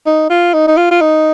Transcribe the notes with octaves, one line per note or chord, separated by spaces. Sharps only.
D#4
F4
D#4
D#4
F4
F4
D#4